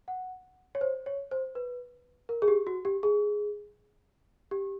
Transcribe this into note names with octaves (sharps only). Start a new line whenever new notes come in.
F#5
C#5
C5
C#5
C5
B4
A#4
G#4
G4
F#4
G4
G#4
G4